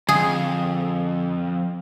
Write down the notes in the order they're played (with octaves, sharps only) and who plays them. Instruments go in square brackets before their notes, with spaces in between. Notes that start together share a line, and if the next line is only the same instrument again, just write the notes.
[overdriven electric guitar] F2 [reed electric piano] D3 [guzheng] G#4